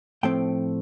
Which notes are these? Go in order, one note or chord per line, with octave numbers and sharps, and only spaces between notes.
A2 F3 A3 C4 G5